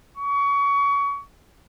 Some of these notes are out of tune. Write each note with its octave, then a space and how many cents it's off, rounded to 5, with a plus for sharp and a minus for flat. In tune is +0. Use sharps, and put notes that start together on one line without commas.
C#6 +30